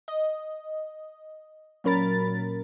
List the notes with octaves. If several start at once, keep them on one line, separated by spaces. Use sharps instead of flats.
D#5
A#2 F#3 C#4 A#4 B5 A6